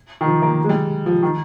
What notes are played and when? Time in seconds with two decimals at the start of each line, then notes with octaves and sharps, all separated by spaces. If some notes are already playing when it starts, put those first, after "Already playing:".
0.21 D#3
0.26 F3
0.42 A#3
0.64 G#3
0.69 G3
1.06 F3
1.23 D#3